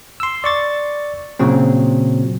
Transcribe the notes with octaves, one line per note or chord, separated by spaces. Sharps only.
C6 E6
D5 C#6 A6
A#2 C#3 F#3 C4